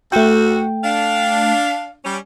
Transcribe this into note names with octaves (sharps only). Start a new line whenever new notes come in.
D2 A3 F#4 G5
D4 F5
G3 C#4